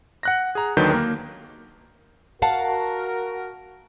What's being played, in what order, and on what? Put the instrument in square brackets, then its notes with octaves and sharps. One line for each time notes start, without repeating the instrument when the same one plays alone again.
[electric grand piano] F#5 F#6 A#6
G#4 A#5
D#2 D3 D#3 F#3 B4 G6
A#3 A#4
[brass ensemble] F#4 A#4 [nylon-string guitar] F5 F#5 A5